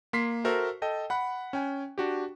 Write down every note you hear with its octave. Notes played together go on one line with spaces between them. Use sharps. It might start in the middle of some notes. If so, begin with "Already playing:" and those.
A#3 C6 B6 C7
F#4 A4 A#4 C5 E5
A4 D#5 G5 A5
F#5 B5 F#6
C#4 G5 G#5
D4 F#4 G4